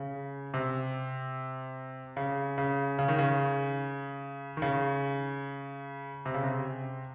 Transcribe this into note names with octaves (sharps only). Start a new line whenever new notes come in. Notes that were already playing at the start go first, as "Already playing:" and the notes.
Already playing: C#3
C3
C#3
C#3
C#3
D#3
C#3
D#3
C#3
C3
C#3
C3